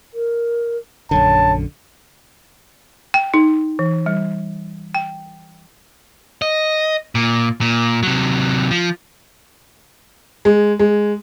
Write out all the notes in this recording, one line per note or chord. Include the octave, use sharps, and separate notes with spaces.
A#4
A#1 F#2 D3 C#5 A5
G5
D#4
E3
G3
G5
D#5
A#2
A#2
C3 F#3
F3
G#3
G#3